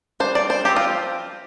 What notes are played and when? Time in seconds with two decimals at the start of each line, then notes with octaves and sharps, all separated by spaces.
0.20 G3 D4 C5
0.35 D5
0.50 C5
0.65 F3 C4 G4
0.76 F4